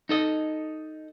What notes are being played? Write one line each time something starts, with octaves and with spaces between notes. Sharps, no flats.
D#4 A4 D#5